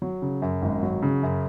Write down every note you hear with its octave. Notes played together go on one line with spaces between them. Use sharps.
F#3
C#3
F#2
G#1
F#3
C#3
F#2